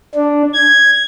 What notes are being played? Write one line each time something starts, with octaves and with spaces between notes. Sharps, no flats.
D4
G#6